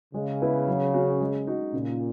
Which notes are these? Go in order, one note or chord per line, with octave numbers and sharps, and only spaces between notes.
C#3 G#3
B3 E4 B4
F#3
C#4 F#4
G#3
D#4 F#4
A#2 C#3